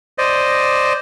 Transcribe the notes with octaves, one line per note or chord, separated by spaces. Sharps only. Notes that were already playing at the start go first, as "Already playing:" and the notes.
C5 D5 D#5